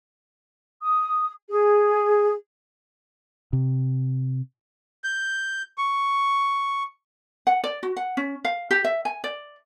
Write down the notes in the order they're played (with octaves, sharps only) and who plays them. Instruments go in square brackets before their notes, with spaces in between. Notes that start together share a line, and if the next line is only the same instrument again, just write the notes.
[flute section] D#6
G#4
[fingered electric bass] C3
[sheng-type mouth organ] G6
C#6
[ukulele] F#5
D5
F#4
F#5
C#4
F5
G4
E5
G#5
D5